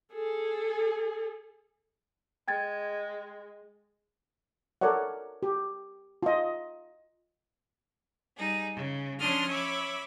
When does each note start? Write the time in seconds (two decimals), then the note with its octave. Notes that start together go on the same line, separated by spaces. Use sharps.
0.13 G#4 A4
2.48 G#3 G5 G#6 A6
4.81 A4 A#4 C#5 D5 F#5
5.43 G4
6.23 F4 D#5
8.38 G3 D#4 G#4
8.76 C#3
9.18 F3 C#4 D4 C6 D#6 F6
9.49 C#5 E5 B5 D6